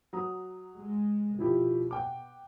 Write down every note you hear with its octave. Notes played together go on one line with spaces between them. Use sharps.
F#3 A#5 D#6
G#3
B2 F3 E4 G4
F#5 G5 D6